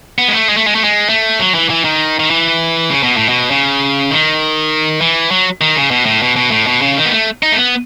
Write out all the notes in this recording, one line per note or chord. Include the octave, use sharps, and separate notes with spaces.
B3
G#3
A3
G#3
A3
G#3
A3
G#3
A3
F#3
E3
E3
D#3
D#3
E3
C#3
B2
A2
B2
C#3
D#3
E3
F#3
D#3
C#3
B2
A2
B2
B2
A2
B2
C#3
D#3
B3
A3
D#4
A3
B3